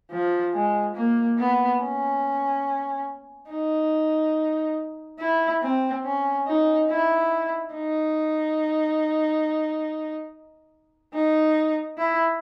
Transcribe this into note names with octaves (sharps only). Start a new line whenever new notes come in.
F3
G#3
A#3
B3
C#4
D#4
E4
C4
C#4
D#4
E4
D#4
D#4
E4